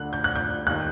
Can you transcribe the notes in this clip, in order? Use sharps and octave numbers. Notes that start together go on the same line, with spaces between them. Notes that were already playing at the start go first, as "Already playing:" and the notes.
Already playing: D2 D3 F#6
G6
F#6
G6
D#2 D#3 F#6